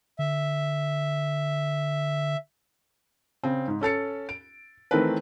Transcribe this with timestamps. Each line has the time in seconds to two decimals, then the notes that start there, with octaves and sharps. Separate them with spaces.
0.19 D3 E5
3.43 C#3 C4
3.68 G#2
3.81 C#4 A4 A6 C#7
4.29 D7
4.91 D#3 E3 A3 C4 A#4 B4